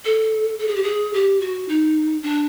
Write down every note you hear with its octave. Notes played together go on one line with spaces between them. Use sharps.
A4
A4
G#4
G4
G#4
G4
F#4
D#4
D4